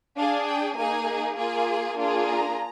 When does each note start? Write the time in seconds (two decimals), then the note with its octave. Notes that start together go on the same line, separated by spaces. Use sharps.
0.17 D4 G#4 F5
0.47 G5
0.77 A#3 D#4 G#4 G#5
1.37 A#3 F4 G#4 G#5
1.97 A#3 D4 F4 G#4
2.27 A#5